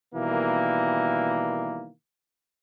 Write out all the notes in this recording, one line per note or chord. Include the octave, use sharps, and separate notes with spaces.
B2 D#3 E3 G3 A#3